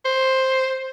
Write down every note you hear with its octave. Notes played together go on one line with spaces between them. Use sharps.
C5